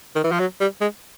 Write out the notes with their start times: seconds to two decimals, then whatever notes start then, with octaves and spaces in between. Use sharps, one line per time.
0.15 D#3
0.24 E3
0.32 F3
0.40 F#3
0.60 G3
0.81 G#3